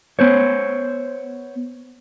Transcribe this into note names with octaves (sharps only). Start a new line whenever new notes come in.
B3 C5 C#5